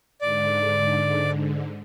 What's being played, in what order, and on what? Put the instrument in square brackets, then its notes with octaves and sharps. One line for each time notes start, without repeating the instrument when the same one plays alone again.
[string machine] G#2 D3 [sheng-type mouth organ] D5